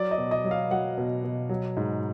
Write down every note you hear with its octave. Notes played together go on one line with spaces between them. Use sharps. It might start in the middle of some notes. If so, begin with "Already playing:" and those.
Already playing: F#3 D5
D#5
B2
D#5
F#3
F5
F#3 F#5
B2
B2
F#3
G#2